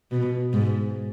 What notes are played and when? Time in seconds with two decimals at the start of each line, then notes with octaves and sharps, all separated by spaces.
0.12 B2
0.53 G#2